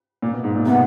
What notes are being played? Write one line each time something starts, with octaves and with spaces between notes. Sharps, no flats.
A#2
B2
G#2
A#2
C3 B3